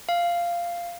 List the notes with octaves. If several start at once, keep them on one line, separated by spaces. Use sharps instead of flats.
F5